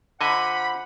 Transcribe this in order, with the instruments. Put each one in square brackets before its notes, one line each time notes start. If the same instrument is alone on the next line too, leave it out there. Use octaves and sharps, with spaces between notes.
[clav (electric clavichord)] D3 D#5 G#5 [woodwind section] F4 C5 F#5 [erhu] B5